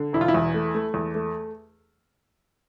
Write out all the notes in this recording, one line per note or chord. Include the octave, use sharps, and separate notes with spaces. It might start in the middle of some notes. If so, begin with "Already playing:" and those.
Already playing: D3
E1 E4
F4
E4
E2
A3
A3
E2
A3